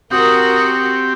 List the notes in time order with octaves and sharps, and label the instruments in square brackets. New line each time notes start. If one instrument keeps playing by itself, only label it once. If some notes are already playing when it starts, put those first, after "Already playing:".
[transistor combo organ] C4 G4 [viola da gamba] F#4 [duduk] A#4 [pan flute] D#6